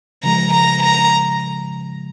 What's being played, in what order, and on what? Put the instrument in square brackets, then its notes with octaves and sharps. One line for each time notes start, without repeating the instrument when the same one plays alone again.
[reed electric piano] C#3 F3 G#3 [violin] A#5
[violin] A#5
A#5